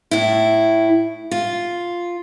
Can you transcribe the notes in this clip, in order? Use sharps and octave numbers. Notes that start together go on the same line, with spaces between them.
A2 E4
F4